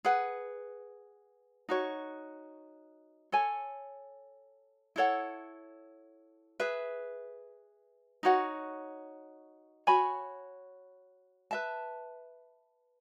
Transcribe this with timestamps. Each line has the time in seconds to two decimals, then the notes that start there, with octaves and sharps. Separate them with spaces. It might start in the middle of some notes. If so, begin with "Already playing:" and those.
0.05 G#4 B4 F#5
1.69 D#4 F#4 C#5
3.32 A4 C#5 G#5
4.96 E4 A4 C#5 F#5
6.60 G#4 B4 E5
8.23 D#4 F#4 C#5 F#5
9.87 F#4 C#5 G#5 B5
11.51 B4 E5 A5